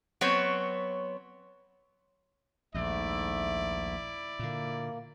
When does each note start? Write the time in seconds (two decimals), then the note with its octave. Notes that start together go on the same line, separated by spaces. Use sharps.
0.21 F#3 B3 C4 C#5
2.74 A#1 D#2 G#2 A3 E4 D5 E5
4.39 A#2 D3 A#3